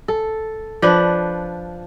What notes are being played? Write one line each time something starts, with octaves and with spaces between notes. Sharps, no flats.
A4
F3 D4 B4